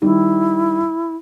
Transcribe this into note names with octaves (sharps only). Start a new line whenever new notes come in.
D#3 G3 E4